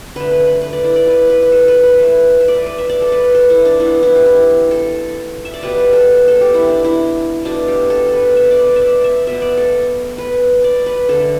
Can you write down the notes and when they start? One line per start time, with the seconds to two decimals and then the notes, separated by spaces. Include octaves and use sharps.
0.16 D3 A3 B4
0.31 B4
0.46 B4
0.62 B4
0.73 D5
0.84 E4
0.96 D5
1.07 B4
1.30 B4
1.42 B4
1.52 A4
1.68 B4
1.83 B4
1.98 E3 A3
2.41 E5
2.48 D5
2.55 B4
2.66 B4
2.78 E5
2.90 D5
3.02 A4
3.12 B4
3.35 A4
3.50 E4
3.65 D4
3.80 E3 B3 E4
4.03 E4
4.16 G4
4.26 E4
4.71 A4
5.45 E5
5.54 D5
5.63 B2 G3 B3 B4
5.78 B4
5.93 A4
6.28 A4
6.41 G4
6.54 E4
6.69 D4
6.84 E4
7.44 B2 A3 D4
7.68 G4
7.90 A4
8.08 A4
8.13 B4
8.36 E5
8.51 D5
8.58 B4
8.76 E5
8.82 D5
9.04 E5
9.27 B2 B3 E5
9.42 D5
9.57 A4
10.18 B4
10.64 D5
10.86 B4
11.09 D3 A3 A4